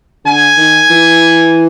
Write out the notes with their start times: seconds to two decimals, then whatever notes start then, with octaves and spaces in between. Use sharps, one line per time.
0.25 D3 G#5
0.57 D#3
0.90 E3